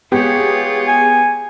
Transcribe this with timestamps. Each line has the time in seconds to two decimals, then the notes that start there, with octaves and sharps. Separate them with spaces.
0.12 G#3 B3 F4 G4 G#4 C#5
0.88 G#5